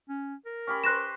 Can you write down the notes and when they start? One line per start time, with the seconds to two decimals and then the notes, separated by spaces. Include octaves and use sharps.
0.09 C#4
0.46 A#4
0.67 C#4 G4 B5
0.84 B4 C5 C#6 F#6 A#6 E7